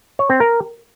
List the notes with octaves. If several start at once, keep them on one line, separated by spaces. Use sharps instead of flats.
C#5
C4
A#4